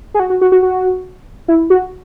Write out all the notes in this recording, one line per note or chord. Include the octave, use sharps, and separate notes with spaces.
G#4
F#4
F#4
F#4
F#4
F#4
E4
F#4